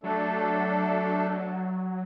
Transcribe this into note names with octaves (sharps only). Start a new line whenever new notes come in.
F#3 A3 D4 A4